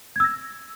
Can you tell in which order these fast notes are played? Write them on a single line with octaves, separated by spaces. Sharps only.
G#6 E6 A#6